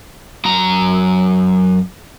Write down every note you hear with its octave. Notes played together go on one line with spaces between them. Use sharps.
F#2 A#5